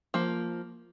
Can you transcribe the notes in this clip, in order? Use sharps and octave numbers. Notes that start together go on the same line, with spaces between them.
F3 A#3